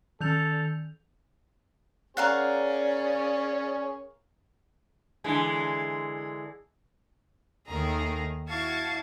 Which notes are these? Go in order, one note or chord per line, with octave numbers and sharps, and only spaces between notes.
D#3 A4 G6 F7
C#4 G#4 A#4 C#5 D5 F5 F#5
D3 E3 G#3
D#2 D#3 A3 G#4 A#5
E4 F#4 F5 A5 C#6 G#6